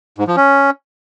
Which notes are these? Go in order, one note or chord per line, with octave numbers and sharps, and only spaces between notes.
G#2
F3
C#4